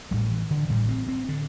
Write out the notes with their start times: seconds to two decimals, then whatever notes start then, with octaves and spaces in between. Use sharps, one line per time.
0.11 A1 A2 G3
0.30 E3
0.51 D3
0.69 A1 A2 G3
0.89 C4
1.08 C4
1.29 D3